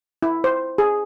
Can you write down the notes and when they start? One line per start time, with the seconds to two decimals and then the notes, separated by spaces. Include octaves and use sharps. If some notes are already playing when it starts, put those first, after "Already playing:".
0.23 E4
0.44 C5
0.78 G#4